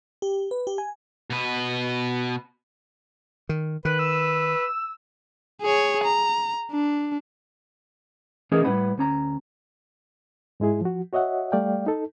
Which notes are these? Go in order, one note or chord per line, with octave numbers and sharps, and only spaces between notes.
G4
B4
G4
G#5
B2 B4
D#3
D#3 B4 F#6
E6
G#4 C#5
A#5
D4
E3 A3 C#4 D#4 G#4 A#4
A2 G3 B4 F#5 B5
D2 C#4 A#5
G#2 G#3 E4 G#4
F3 F#4
F#4 C#5 D#5 E5 F#5
G3 A3 D5 F5 G5
D#4 A4